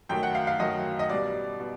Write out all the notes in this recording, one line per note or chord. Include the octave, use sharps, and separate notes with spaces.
F#2 D#3 F#3 A3 G5
F#5
F5
F5
F#2 D#3 F#3 A3 D#5
D#5
B2 G3 D5
B2